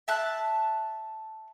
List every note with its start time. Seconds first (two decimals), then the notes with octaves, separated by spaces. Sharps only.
0.08 E5 A5 F#6